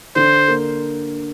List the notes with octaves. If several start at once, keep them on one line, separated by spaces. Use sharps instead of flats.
D3 C5
A#3